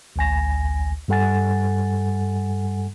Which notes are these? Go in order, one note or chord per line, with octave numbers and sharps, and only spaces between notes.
A1 D2 G#5 A#6
G2 G3 A4 F#5 G#5 A6